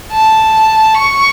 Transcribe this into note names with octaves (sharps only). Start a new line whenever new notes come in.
A5
C#6